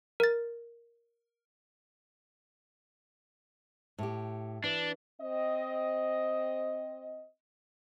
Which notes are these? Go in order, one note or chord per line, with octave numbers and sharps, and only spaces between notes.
A#4 A6
A2 G4
E3 D4
C4 D#5